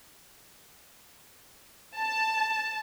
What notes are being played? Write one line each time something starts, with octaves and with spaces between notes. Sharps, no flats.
A5